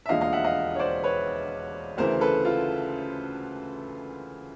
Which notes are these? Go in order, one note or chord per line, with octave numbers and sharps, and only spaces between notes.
E5
E1 D#2 D3 F3 D#5 F5
D#5 F5
E5 F#5
D#5 F5
C#5
C5 D5
B4 C#5
D2 C#3 E3 A#4 C5
A4 B4
F4